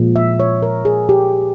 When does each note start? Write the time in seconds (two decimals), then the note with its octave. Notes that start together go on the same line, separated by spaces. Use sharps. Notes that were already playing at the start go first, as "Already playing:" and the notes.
Already playing: A#2 F3 G#3
0.16 E5
0.40 C#5
0.63 A#4
0.85 G#4
1.09 G4